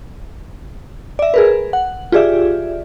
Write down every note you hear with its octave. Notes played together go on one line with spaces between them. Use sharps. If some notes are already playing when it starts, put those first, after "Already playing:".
D5 E5
G#4 A#4 B4
F#5
F4 G4 G#4 D5 E5